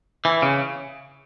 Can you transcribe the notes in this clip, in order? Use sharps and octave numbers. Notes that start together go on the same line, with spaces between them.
E3
C#3